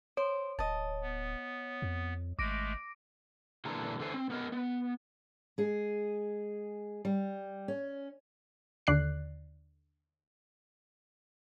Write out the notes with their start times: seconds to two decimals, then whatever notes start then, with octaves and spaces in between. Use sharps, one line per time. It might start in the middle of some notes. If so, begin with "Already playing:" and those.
0.17 C5 C#5
0.59 D1 D#5 A5
1.02 B3
1.82 F2
2.39 G#1 G#3 A3 D6 A#6 D7
3.65 A#2 D3 E3 A4 A#5
3.99 D3 E3 A4 C5 G#5
4.14 C4
4.30 B3 A#4 D#5
4.52 B3
5.58 G#3 G#4
7.05 G3
7.68 C#4
8.87 D#2 D3 D5 F#6 C7